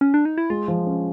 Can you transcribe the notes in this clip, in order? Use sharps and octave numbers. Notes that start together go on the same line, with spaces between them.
C#4
D4
D#4
E4
G#3 F4
F3
C#4